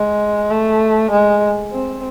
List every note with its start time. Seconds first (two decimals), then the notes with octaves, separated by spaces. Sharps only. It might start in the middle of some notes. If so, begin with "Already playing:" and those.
Already playing: G#3
0.51 A3
1.11 G#3
1.72 C4